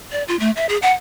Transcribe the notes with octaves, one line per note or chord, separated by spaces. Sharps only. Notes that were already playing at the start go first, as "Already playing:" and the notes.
D5
F4
A3
E5
G#4
F#5